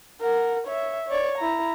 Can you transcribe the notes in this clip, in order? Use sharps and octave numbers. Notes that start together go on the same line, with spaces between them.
A#4 F#5
C#5 E5
C#5 D5
E4 A#5